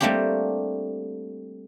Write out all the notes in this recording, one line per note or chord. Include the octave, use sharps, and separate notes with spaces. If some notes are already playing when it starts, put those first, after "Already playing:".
G3 A3 A#3 C4 D4 G4